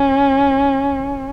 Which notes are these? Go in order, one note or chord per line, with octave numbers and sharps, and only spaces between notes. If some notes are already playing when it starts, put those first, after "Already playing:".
Already playing: C#4